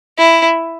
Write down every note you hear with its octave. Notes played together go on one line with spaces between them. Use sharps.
E4